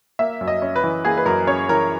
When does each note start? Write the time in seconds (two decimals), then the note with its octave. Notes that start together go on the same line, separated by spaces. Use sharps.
0.19 A#3 E5
0.41 F#2
0.48 D#5
0.62 C#4
0.76 B4
0.83 E3
1.05 A#3 G#4
1.17 B4
1.26 F#2 A#4
1.47 C#4 C#5
1.69 E3 A#4